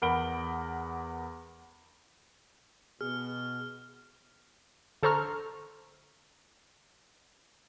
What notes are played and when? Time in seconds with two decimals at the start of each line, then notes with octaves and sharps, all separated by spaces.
0.02 E2 A#4 F#5 B5 D7 G7
3.01 B2 G#4 F6
5.03 D3 A4 C5 A#5 C#6 F6